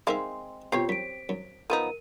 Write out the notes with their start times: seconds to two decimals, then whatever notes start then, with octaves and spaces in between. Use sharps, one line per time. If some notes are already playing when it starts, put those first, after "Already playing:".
0.07 G#3 C4 D#4 A#4 E5 F5
0.72 B2 C4 F4 G4 C#5 C7
0.89 F#2 B6 D7
1.29 F#2
1.70 F3 B3 D#4 A#4 D#7